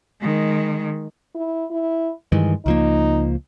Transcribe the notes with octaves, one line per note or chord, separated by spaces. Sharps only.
D#3 G#3
E4
E4
G2 D#3 E3 G#3
C#2 F3 A#3 D#4